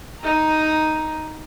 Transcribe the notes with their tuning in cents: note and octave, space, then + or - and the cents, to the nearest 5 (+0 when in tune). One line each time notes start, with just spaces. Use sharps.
D#4 +0 A#5 +5